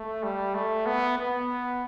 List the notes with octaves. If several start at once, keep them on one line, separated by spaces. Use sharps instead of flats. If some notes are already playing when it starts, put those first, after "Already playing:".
Already playing: A3
G3
A3
B3
B3